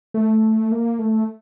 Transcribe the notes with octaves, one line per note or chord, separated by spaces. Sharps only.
A3
A#3
A3